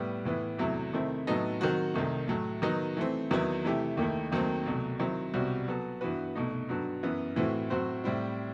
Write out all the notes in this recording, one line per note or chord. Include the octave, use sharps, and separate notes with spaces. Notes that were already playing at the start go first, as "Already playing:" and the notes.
Already playing: A2 G3 B3
A2 E3 B3
E2 C3 F#3 A3 E4
C3 D#3 A3 C4 E4
A2 F#3 B3 D#4 A4
D#3 F#3 C4 F#4
C2 C3 D#3 A3
A2 F#3 A3
D#3 F#3 B3 D#4
E3 A3 C4
E2 D#3 F#3 B3 E4
C3 E3 A3 E4 G4
D#2 D#3 A3 E4
D#2 D#3 F#3 A3 C4
C2 B2 F#3 A3
D#3 F#3 C4 E4
C2 B2 G3 C4 F#4
F#3 B3 F#4 A4
G2 E3 B3 F#4 B4
C2 B2 A3 D#4
G2 F#3 B3 F#4 A4
F#2 E3 B3
A2 E3 A3 C4 F#4
A2 F#3 C4 F#4 C5
A2 G3 C4 E4